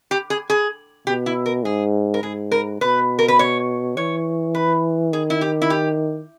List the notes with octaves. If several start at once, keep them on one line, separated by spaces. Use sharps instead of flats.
G4
G#4
G#4
B2 G4
E4
A#4
G#2 G#4
A#4
G#2 G#4
A#4
B2 B4
A#4
B4
C#5
E3 C#5
B4
D#3 G#4
E4
G4
E4
G4